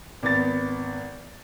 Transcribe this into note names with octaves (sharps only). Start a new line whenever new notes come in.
G#1 B3 A6